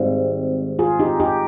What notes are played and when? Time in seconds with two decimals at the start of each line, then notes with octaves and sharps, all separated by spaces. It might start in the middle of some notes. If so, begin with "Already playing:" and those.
Already playing: G#1 G#2 G3 C4
0.79 F4 G#4
1.00 D#4 G4
1.20 D#4 G4